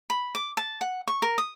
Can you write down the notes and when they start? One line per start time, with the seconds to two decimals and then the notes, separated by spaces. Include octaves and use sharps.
0.10 B5
0.35 D6
0.57 A5
0.81 F#5
1.08 C#6
1.22 A#4
1.38 D#6